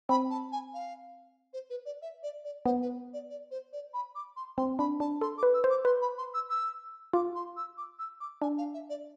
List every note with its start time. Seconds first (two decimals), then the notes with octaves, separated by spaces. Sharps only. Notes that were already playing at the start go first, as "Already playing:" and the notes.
0.09 C4 B5
0.30 A5
0.52 G#5
0.73 F5
1.53 C5
1.69 B4
1.85 D5
2.01 E5
2.22 D5
2.44 D5
2.65 B3 C5
2.81 B4
3.13 D5
3.29 D5
3.51 C5
3.72 D5
3.93 B5
4.15 D6
4.36 C6
4.57 C4 C6
4.78 D4 B5
5.00 D4 A5
5.21 A4 C6
5.37 D6
5.43 B4
5.54 E6
5.64 C5
5.69 D6
5.85 B4 C6
6.01 B5
6.17 C6
6.33 E6
6.49 E6
7.13 F4 D6
7.35 C6
7.56 E6
7.77 D6
7.98 E6
8.20 D6
8.41 D4 G#5
8.57 F5
8.73 E5
8.89 D5